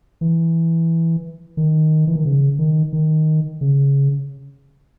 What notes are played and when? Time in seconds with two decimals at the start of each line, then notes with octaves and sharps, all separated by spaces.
0.21 E3
1.57 D#3
2.07 E3
2.16 D#3
2.25 C#3
2.59 D#3
2.93 D#3
3.61 C#3